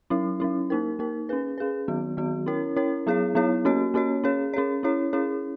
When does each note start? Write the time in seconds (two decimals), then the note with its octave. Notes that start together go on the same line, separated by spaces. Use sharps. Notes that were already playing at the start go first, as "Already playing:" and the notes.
0.10 F#3 C#4 E4
0.40 F#3 C#4 E4
0.70 A#3 D#4 A#4
0.99 A#3 D#4 A#4
1.29 C#4 G#4 B4
1.58 C#4 G#4 B4
1.88 D#3 F#3 B3 F#4
2.17 D#3 F#3 B3 F#4
2.46 C#4 E4 A#4 C#5
2.76 C#4 E4 A#4 C#5
3.07 F#3 B3 E4 G#4 C#5
3.35 F#3 B3 E4 G#4 C#5
3.65 A#3 C#4 F#4 C#5
3.94 A#3 C#4 F#4 C#5
4.24 C#4 G#4 C#5
4.54 C#4 G#4 C#5
4.83 C#4 E4 G#4 C#5
5.13 C#4 E4 G#4 C#5